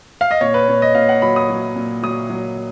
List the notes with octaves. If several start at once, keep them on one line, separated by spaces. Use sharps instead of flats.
F5
D#5
A#2 C#5
B4
A#2 C#5
D#5
A#2 F5
F#5
F#3 B5
D#6
F#3
A#2
F#3 D#6
F#3